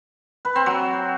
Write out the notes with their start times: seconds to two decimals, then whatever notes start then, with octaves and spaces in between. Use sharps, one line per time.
0.45 B4
0.55 C4
0.66 F#3